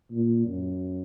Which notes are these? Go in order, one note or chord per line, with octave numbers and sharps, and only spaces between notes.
A#2
F#2